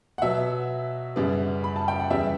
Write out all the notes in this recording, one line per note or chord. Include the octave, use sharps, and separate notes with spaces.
F#5
B2 F#3 B3 E5
F#2 C#3 G3 B3
B5
A5
G5
F#5
E2 C#3 G3 B3 E5